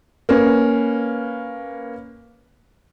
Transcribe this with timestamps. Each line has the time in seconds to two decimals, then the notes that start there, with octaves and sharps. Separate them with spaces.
0.29 A#3 C#4 B4